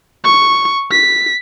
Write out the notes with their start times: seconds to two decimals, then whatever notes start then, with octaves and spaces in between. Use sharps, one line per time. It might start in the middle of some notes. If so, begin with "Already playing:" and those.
0.24 C#6
0.91 B6